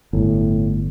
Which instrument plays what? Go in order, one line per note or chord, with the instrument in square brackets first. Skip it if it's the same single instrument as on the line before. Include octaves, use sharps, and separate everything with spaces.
[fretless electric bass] G1 [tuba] A2